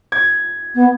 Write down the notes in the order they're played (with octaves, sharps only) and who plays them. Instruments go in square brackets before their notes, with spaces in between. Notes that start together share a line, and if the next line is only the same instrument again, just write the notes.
[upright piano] G#6
[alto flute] B3